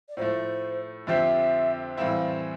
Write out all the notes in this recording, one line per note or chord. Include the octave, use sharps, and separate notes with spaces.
D5
A2 F3 A3 C5
F2 D3 F3 C4 G4 E5
A2 E3 G3 C4 E4 F5